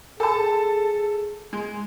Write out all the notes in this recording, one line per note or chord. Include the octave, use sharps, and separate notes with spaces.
G#4 A4 A5
G#3